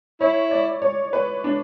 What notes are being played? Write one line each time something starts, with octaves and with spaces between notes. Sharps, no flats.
E4 C#5
D5
C#5
B4
D4